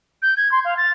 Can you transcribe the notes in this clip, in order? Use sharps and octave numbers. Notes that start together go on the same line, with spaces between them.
G6
G#6
C6
F5
A6